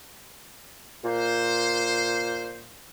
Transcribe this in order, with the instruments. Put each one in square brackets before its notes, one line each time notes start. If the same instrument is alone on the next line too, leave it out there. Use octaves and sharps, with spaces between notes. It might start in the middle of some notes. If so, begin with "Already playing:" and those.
[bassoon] A#2 [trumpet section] C5